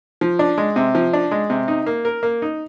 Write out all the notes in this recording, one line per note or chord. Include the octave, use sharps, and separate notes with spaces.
F3
D4
G#3
C3
F3
D4
G#3
C3
D#4
A#3
A#4
A#3
D#4